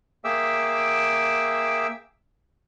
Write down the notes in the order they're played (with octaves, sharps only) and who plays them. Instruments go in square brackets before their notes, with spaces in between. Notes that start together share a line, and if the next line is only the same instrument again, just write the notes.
[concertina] A#3 G#4 E5 G5 D6 E6